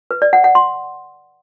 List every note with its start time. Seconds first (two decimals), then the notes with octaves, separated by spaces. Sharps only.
0.11 B4
0.22 D5
0.33 F#5
0.44 F#5
0.55 C6